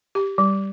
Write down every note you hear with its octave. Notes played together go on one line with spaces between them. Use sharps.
G4
G3